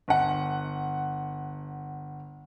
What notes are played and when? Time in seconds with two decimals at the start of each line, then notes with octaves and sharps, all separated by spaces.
0.08 G1 F#5